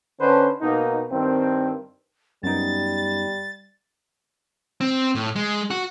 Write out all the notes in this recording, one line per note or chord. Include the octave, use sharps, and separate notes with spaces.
D3 C#4 D4 B4 C5
B2 A#3 D#4
G2 D#3 C4
F#2 G3 B3 D#4 A6
C4
A2
G#3
F#4